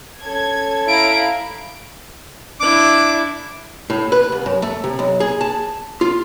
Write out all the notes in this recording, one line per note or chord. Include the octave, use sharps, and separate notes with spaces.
C#4 A4 G#6
E4 F5 A#5 D7
D4 E4 D6
A2
B4
C2
F#2
A3
C3
B1
G#4
A5
F4